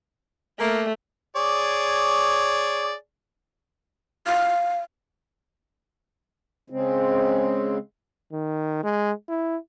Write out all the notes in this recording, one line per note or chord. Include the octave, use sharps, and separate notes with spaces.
A3 A#3
G#4 C#5 D5
F5
C#3 G#3 C4
D#3
G#3
E4